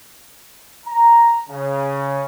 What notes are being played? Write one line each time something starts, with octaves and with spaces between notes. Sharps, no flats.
A#5
C#3